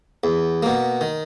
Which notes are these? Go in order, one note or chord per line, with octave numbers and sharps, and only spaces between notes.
E2
B2 A#3
D#3